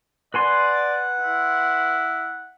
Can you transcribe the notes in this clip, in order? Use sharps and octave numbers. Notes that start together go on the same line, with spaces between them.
B4 D5 F#5 G#5 C6
E4